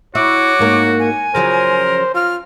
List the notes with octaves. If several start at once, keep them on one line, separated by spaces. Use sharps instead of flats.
E4 F#4 C#5 D6
G#2 A#3 A#4
G#5
C#3 F3 F#3 A#4 C5
F4 F6